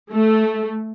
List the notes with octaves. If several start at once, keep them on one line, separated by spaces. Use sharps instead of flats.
A3